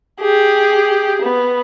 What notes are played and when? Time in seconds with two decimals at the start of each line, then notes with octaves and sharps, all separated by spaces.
0.20 G4 G#4
1.22 B3